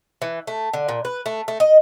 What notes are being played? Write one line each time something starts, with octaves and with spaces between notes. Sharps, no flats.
E3
A3
D3
A#2
B4
A3
A3
D#5